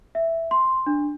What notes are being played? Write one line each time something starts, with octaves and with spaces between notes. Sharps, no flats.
E5
C6
D4